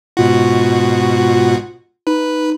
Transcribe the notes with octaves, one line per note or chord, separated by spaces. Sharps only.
G#2 B2 F4 F#4
D#4 B4